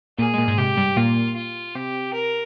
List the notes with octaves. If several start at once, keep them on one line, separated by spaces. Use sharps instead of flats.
A#2 A#3 G#4
G#3
A#2 A#3
G#2 G#3
C3 G4
G2 G3
A#2 A#3 F4
F4
C3 C4 G4
A#4